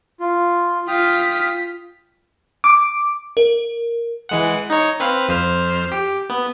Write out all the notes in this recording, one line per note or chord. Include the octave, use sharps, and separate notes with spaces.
F4
F4 G5 D#6 F6 B6
D6
A#4
E3 G#3 F#5
D#4 C#5
C4 B4 F5
F2 C5 F6
G4
B3